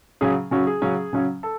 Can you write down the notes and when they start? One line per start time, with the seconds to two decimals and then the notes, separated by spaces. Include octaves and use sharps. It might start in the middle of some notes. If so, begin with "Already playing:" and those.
0.21 C#3 F#3 C#4 G#4
0.51 C#3 F#3 C#4 F#4
0.67 G#4
0.82 C#3 F#3 C#4
1.13 C#3 F#3 C#4
1.43 A4